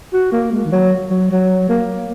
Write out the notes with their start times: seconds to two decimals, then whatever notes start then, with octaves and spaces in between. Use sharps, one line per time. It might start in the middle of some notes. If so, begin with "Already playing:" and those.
0.13 F#4
0.32 A#3
0.52 G#3
0.65 D#3
0.72 F#3
1.10 F#3
1.31 F#3
1.69 A#3